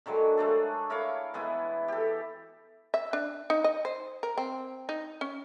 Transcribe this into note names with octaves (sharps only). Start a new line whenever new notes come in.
D3 D#3 F#3 G#3
G#3 A3 D4 A4
E4 A#4 C#5 F5
E3 G#3 B3 E4
G4 A4
E5
D4
D#4
D#5
C5
A#4
C4
D#4
C#4